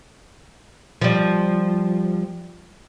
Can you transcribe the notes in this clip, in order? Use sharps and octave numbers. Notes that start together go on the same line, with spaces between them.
F3 G3